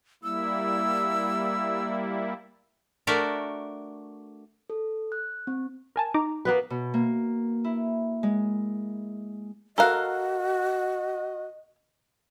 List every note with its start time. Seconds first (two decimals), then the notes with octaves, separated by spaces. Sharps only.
0.24 G3 A#3 E4 E6
3.07 A3 D4 F#4 A#4 D5 E5
4.70 A4
5.12 F#6
5.47 C4
5.96 A#4 G#5 A5
6.14 D#4 A#5 D6
6.45 A#3 B3 B4
6.70 B2
6.94 A#3
7.64 E4
8.23 G#3
9.78 F#4 A4 A#4 D#5 F5 A#5 F#6